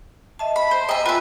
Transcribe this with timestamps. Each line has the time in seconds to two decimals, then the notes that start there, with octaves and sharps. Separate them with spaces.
0.39 D#5 E5 A5
0.56 B5
0.71 C5
0.89 D#5 E5 G5 G#5 A#5
1.06 F4 B4 E5